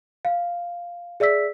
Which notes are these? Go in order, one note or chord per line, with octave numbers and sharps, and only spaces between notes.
F5
G#4 D5 E5 E6 B6